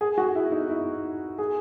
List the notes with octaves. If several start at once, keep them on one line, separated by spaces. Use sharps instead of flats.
G#4
F#4
E4
D#4
E4
G#4